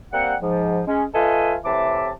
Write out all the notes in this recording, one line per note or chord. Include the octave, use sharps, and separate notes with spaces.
G3 A#3 C4 F#5
G#2 F3
G#3 C#4
A3 F4 A4 B4 D#5 G#5
A2 C3 E3 E5 A5 D6